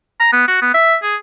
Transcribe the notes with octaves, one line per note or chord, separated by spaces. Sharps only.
A#5
B3
F#4
B3
E5
G#4